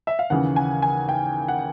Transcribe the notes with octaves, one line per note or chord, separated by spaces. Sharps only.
E5
F5
D#2 C#3 E3 F#5
G#5
G#5
G5
F#5